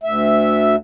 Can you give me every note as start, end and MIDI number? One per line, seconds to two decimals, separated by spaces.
0.03 0.76 38
0.03 0.76 76